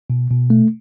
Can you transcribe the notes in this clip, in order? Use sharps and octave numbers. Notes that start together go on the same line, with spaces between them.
B2
B2
A3